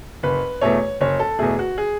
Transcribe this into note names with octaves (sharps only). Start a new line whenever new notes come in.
F#1 B4
E2 B2 A3 C#5
F#1 C#5
A4
E2 B2 A3 G#4
F#4
G#4